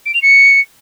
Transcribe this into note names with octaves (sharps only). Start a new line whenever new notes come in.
D7
F7
C#7